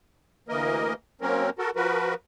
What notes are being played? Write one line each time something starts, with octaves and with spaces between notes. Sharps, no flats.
D2 E3 A#3 A#4 D#5
F#3 A#3 C4 C#4 A#4
F#4 A4 A#4
F3 F#4 A#4 B4